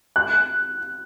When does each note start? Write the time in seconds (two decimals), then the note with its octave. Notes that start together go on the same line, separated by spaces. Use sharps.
0.16 F#6